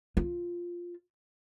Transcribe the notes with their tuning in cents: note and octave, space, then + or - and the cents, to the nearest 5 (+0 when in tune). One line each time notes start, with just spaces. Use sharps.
F4 +0